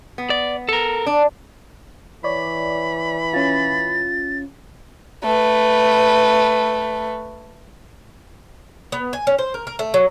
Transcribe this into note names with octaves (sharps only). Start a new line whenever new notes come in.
B3
D5
A4 A#4
D4
E3 C#5 D5 B5
C#4 F4 A6
A3 B4
B3
G#5
C#4
C5
A#4
A#4
A3
F#3